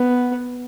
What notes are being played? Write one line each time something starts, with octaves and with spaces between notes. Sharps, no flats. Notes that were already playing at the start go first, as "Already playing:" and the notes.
Already playing: B3